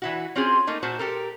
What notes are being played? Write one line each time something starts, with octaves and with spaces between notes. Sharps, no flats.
E3 E4 F#4
C4 C#4 F4 F#4 G#4
A3 A#3 D#4
A#2 F#4 C5 A5
G4 A4 A#4